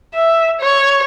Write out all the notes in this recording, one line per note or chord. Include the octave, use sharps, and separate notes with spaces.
E5
C#5